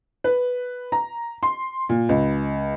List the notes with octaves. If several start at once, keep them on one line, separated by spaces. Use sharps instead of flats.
B4
A#5
C6
A#2
C#2